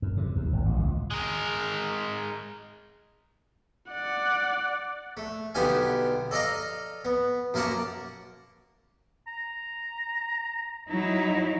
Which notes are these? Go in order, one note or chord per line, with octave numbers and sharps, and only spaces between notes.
F#2
C3
D#2
G#1
A1
C#2
G#3 A#4
D5 F#5
A3
B1 D3 B3 G4 F5 G#5
A4 D5 D#5 F5 A#5
B3
F#2 A#3 F5 F#5 A5 D6
A#5
F#3 D#4 E4 A#5